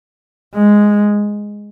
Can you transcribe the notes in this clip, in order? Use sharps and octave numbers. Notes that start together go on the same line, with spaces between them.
G#3